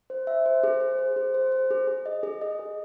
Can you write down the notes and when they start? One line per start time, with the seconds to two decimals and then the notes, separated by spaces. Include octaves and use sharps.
0.10 C5
0.27 E5
0.46 C5
0.64 G#4
0.80 C5
0.99 C5
1.16 G#4
1.34 C5
1.52 C5
1.71 G#4
1.87 G#4
2.06 D#5
2.23 G#4
2.41 D#5
2.59 G#4